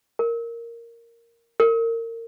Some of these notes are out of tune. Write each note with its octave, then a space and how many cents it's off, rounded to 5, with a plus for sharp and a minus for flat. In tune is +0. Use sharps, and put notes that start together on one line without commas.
A#4 -5
A#4 -30